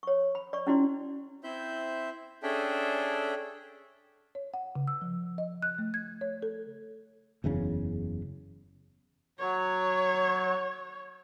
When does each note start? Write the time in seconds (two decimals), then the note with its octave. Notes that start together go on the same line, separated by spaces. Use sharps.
0.03 C#5 C#6
0.35 B5
0.53 D5 C#6
0.67 C#4 D#4 E4 F#4 D5 C6
1.44 C4 E4 C5 E5 G6
2.43 C#4 D4 G#4 A4 E5 G5
4.35 C#5
4.54 F#5
4.76 C#3
4.88 E6
5.01 F3
5.38 D#5
5.62 F#6
5.79 A3
5.94 G#6
6.21 C#5
6.42 A4
7.44 F#1 E2 C#3 C#4
9.39 F#3 C#5